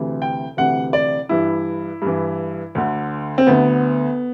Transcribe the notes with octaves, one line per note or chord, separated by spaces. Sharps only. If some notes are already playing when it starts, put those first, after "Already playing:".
Already playing: D2 C3 E3
G5
D2 C3 E3 F#5
D5
G2 E3 E4
G2 E3
D2 D3
C4
D2 D3 B3